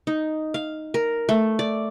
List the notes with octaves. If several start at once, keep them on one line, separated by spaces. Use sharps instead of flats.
D#4
F5
A#4
A3
D5